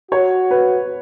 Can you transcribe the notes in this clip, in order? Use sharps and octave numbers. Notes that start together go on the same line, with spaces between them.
F#4 C#5
B4